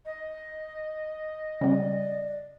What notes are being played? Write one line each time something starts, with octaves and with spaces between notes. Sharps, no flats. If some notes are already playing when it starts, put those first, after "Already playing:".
D#5
C#3 G3 D5